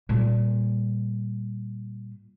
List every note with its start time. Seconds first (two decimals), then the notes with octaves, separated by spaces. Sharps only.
0.09 A#2 G3